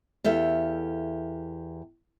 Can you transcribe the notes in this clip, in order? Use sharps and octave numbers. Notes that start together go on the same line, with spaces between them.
E2 G4 A4 E5 F5